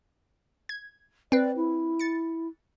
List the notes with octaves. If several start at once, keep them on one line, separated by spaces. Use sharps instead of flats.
G#6
C4 B4 D5
E4
A6 C#7